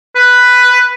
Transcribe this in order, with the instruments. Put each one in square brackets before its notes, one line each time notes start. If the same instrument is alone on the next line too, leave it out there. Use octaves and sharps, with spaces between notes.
[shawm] B4